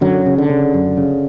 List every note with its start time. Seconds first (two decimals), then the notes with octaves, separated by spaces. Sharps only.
0.01 F#2 D3 F#3
0.26 C#3
0.38 D3
0.50 C#3
0.74 F#2
0.97 C#3